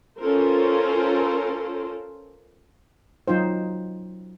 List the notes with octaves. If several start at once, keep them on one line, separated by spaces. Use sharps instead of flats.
C#4 F4 A4 A#4 C5
F#3 D#4 F4 C5